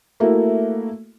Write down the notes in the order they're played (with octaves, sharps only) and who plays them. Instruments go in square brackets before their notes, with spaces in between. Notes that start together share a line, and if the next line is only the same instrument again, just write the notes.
[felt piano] A3 A#3 E4 F#4